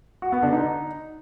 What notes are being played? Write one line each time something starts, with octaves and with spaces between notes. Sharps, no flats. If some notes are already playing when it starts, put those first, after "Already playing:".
F#4
B3
D3
D#4